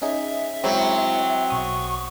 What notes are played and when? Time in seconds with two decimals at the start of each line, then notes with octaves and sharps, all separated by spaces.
0.02 C#4 D#4 G#4 E5
0.64 F#3 G#3 C4 E4 C5
1.50 B1 C#6 D#6